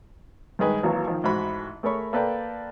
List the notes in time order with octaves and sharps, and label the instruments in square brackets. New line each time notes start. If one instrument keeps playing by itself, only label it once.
[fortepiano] G2 D#3 G#3 B4
G#1 E3 F#3 A#3
D#3 F3
A1 G#2 F#4 B5
A3 G#4 A#4 C#5 B5 C#6
A#3 A4 B4 D5 G5